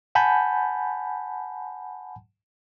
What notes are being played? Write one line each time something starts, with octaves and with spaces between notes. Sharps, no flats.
F#5 G#5 A5 B5 G6